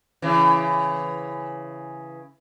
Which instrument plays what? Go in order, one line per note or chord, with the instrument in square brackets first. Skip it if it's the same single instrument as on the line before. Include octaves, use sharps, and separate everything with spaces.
[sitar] C#3 E3